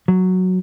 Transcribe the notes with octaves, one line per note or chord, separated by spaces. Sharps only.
F#3